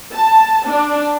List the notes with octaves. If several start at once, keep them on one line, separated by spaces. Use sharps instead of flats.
A5
D4